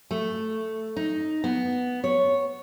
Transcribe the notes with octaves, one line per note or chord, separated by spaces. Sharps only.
A3
D#4
B3
C#5